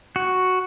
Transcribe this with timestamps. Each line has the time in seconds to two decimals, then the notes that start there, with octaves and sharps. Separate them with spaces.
0.16 F#4